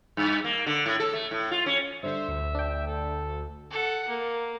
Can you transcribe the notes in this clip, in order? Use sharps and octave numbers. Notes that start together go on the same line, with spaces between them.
G2
A#3
D3
A2
A4
A3
A2
F4
C#4
G2 D3 C5 E5
D2
D4 G5
A4
A4 F#5
A#3